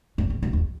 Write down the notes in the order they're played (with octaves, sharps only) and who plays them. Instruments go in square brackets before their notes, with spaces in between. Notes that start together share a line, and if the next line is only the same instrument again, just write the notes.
[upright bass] F#2
E2
F#2
E2